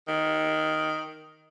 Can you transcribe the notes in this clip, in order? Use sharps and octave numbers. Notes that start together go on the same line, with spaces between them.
D#3